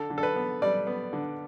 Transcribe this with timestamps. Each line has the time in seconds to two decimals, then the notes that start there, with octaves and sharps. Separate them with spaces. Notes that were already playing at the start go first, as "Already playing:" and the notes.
Already playing: D3 A4
0.10 D3
0.18 A4
0.23 B4
0.36 B3
0.62 G3 D5
0.87 B3
1.13 D3